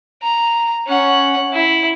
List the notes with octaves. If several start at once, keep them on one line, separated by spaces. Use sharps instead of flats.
A#5
C#4 F#5
E4